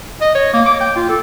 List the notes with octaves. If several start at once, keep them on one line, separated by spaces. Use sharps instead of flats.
D#5
C#5
A#3
D6
G5
F4
A4